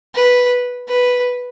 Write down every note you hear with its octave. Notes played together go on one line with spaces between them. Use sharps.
B4
B4